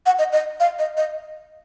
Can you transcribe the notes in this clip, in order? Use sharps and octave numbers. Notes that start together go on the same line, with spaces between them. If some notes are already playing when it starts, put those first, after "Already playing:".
F#5
D#5
D#5
F5
D#5
D#5